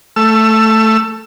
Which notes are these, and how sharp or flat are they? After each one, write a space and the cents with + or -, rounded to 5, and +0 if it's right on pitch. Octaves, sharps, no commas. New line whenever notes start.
A3 +0 E6 +20